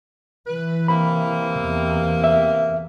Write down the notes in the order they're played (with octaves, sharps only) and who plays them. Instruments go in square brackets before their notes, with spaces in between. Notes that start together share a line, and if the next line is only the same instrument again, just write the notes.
[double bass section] E3 [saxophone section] B4
[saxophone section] C3 A#3 [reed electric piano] B5
[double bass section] E2
[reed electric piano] E5